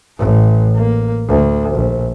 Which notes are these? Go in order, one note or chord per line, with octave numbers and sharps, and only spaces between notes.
A1
A#3
D2
A#1